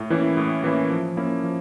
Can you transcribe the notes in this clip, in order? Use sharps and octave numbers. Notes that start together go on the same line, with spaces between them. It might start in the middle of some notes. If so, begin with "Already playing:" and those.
Already playing: A2
E3 A#3 C#4 E4
A2
E3 A#3 C#4 E4
F3
A#3 C#4 E4
F3